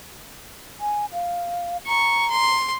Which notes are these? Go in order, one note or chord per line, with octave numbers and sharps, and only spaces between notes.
G#5
F5
A#5 C#6
C6